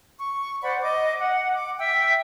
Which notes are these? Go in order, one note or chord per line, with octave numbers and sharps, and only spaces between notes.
C#6
C5 D5 F#5 B5
D#5 D6
F#5
D6
E5 G5 E6